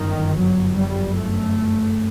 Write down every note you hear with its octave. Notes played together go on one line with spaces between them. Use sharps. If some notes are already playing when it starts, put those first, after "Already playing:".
Already playing: G1 F#2 D#3
F#3
G3
A3